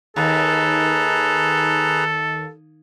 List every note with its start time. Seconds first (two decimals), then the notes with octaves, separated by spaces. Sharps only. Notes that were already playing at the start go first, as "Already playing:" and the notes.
0.16 D#2 G#4 A4 B4 A#5